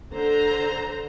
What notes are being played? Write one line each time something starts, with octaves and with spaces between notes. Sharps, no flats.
D3 C5 A#5